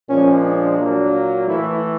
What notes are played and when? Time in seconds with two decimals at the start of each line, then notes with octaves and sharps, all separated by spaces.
0.09 A#2 F3 G#3 C#4
0.44 D4
0.78 A#2 F#3 A#3
1.48 A2 E3 A3 E4